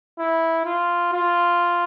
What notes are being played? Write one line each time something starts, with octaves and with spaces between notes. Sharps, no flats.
E4
F4
F4